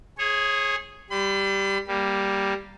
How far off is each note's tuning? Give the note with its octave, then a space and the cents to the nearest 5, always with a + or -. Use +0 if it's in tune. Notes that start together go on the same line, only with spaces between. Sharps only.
G#4 +0 C#5 -30
G3 +0 B5 +45
G3 +0 A#3 +5